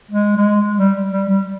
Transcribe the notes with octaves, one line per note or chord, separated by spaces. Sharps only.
G#3
G#3
G3
G3
G3